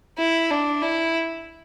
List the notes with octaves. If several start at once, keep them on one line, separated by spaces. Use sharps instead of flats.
E4
D4
E4